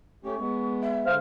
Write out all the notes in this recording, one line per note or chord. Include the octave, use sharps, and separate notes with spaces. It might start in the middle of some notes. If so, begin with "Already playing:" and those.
A3 C#4 G4 C#6
G#3 B3
E5
D3 G#3 C5 F5 F6